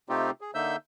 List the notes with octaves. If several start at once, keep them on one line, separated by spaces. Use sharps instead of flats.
C3 A3 C4 D#4 F4 G4
G#4
D3 A#3 D#4 E5 E6 G6